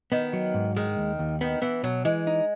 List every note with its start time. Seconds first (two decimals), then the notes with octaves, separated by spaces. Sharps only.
0.12 D#3 B3
0.33 F#3
0.54 G#2
0.76 D#3 G#3
0.98 D#2
1.19 D#2
1.41 D#3 B3
1.62 E3 B3
1.83 B2 F#3
2.05 E3 G#3
2.27 D#4